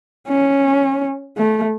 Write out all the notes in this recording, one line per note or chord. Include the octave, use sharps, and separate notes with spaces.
C#4
A3